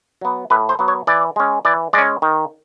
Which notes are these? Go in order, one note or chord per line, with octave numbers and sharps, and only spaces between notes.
F#3 B3
A2 B4
C5
F#3 B3
C#5
E3 D5
G#3 C#4
E3 D5
G#3 C#4 D5
D#3